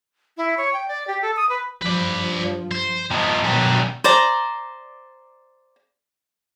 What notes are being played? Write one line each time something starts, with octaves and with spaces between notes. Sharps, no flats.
E4
C#5
G5
D5
G4
A4
D#6
B4
G2 F3 B4 D5
C5
G2 F3 B3 D#4
F#2 B2 D#3 F#3 D4 G4
C5 D5 A#5